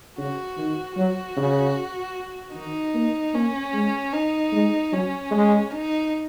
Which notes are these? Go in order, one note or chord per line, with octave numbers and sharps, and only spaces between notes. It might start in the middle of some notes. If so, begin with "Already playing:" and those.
C#3 F#4
D#3
F#3 F#4
C#3
D#3 D#4
A#3
A#3 C#4
G#3
D#4
G#3
F#3 C#4
G#3
D#4